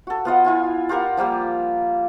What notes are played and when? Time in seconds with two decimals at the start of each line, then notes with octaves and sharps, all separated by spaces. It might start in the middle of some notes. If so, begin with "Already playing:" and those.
0.07 F#4 A4
0.25 B3 F4 D#5 F#5
0.45 E4 F4 G#5
0.89 F4 G4 A#4 F#5
1.17 F3 G3 A#3 G4